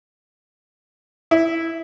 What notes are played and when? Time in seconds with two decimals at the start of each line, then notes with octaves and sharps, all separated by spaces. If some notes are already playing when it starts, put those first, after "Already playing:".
1.31 E4